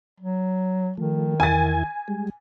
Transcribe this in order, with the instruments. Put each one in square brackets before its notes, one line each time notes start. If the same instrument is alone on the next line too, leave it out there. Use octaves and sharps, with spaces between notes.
[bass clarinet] F#3
[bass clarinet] D#3 [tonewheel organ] F3 A3
[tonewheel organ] E2 E4 G#6 [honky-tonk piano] G#5 A6
[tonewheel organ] G3 G#3